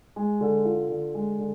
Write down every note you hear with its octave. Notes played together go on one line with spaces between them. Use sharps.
G#3
D3
F4
D3
G#3
D3